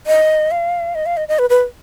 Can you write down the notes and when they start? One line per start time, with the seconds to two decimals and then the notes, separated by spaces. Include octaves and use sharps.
0.07 D#5
0.51 F5
0.95 D#5
1.06 F5
1.17 D#5
1.28 D#5
1.39 B4
1.50 B4